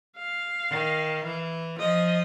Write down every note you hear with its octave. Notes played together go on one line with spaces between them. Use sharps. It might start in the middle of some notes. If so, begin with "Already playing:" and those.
F5
D#3
E3
F3 D#5